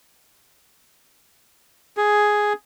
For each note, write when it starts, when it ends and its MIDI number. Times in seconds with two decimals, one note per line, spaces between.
1.97 2.53 68